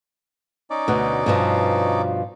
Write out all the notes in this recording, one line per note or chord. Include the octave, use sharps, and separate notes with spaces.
C#4 D#4 D5
D2 B2
G2 B2 F3